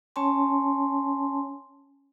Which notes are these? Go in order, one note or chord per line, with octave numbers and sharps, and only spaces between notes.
C#4 C#5 G#5 A5 C6